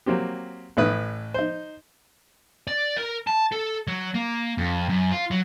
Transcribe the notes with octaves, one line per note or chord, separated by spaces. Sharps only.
F#3 A#3 C4 G4
A1 A2 B4 D#6
D#4 C5
D5
A#4
A5
A4
F#3
A#3
F2
F#2
F4
F#3